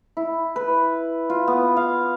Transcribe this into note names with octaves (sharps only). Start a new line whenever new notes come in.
E4
B4
F4
B3
F5